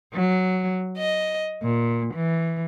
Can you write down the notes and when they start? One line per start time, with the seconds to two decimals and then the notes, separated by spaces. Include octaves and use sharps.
0.13 F#3
0.98 D#5
1.62 A#2
2.13 E3